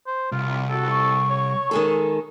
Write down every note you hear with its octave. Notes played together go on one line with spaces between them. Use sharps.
C5
C2 F4
F#4 A4
C#6
C#5
D#3 G#3 G#4 A4